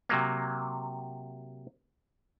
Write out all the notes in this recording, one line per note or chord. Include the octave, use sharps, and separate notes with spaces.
C3 F#3 A#3